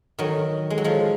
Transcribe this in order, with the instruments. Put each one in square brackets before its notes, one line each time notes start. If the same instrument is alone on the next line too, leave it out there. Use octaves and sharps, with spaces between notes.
[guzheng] D#3 F#3
G#3
F#3
F3 G#3